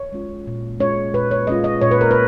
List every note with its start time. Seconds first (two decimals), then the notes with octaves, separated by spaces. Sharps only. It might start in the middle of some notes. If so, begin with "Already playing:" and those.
Already playing: C#5
0.13 G#3 C#4 F4
0.47 A#2
0.80 G#3 C#4 F4 C#5
1.14 A#2 B4
1.31 C#5
1.47 G#3 C#4 F4 D#5
1.64 D#5
1.81 A#2 C#5
1.91 B4
2.01 A#4
2.11 B4